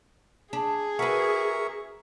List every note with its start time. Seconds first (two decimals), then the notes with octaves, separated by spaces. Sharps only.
0.53 D4 G#4
0.99 F#4 A#4 B4 E5 C#6